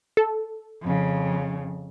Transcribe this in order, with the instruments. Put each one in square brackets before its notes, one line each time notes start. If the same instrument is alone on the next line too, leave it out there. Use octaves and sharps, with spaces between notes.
[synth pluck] A4
[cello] F2 C#3